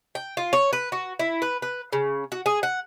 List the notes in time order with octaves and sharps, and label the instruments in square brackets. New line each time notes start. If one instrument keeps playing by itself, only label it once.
[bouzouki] G5
F4
C#5
B4
F#4
E4
B4
B4
C#3
F#4
G#4
F#5